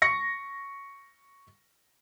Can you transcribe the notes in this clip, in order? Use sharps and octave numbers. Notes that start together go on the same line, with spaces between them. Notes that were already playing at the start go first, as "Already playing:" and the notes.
C#6 A#6 C#7